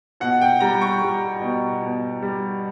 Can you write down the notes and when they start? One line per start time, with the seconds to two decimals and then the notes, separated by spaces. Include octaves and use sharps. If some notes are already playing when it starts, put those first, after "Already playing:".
0.20 B2 F#5
0.41 G5
0.60 G3 A#5
0.81 C#6
1.02 G3
1.42 B2
1.82 B2
2.22 G3